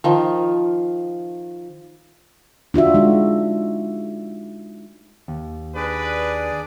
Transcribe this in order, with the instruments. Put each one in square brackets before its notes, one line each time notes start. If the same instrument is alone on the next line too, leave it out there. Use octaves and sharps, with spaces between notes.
[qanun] D#3 F3
[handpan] D4 F4 F#4 E5
G#3 D#4 F#4
[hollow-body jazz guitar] D#2
[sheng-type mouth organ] D4 G#4 D5 [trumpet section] B4